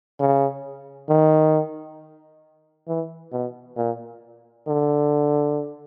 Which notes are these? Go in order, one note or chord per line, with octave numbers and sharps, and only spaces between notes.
C#3
D#3
E3
B2
A#2
D3